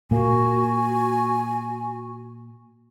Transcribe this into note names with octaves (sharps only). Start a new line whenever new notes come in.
A#2 A#3 F#4 G#5